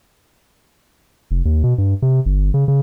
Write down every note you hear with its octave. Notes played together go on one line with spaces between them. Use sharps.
F1
D#2
B2
G2
C3
G1
C#3
C#3